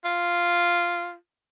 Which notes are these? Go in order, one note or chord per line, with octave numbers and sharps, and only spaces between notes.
F4